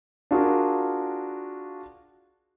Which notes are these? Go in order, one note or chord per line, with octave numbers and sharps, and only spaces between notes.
D4 F4 F#4 G#4 A#4